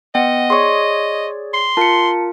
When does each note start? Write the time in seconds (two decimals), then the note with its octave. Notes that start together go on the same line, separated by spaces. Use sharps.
0.15 B3 D#5 F#5 G5
0.50 G#4 C#5 D5 C6 C#6
1.54 C6
1.77 F4 A#4 A5 C#7